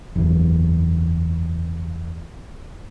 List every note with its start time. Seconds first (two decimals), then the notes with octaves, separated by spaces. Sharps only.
0.16 F#1 E2